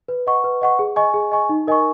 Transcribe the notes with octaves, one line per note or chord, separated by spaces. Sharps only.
B4
D#5 F#5 C#6
B4
D#5 F#5 C#6
G#4
D#5 G#5 C#6
G#4
D#5 G#5 C#6
D#4
A#4 D#5 G#5 C#6